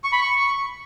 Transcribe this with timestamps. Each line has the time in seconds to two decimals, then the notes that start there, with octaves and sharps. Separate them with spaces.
0.04 C#6
0.13 B5
0.21 C#6